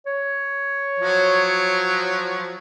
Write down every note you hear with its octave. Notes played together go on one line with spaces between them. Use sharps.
C#5
F3 F#3